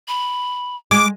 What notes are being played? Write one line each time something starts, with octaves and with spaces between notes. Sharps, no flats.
B5
G#3 D6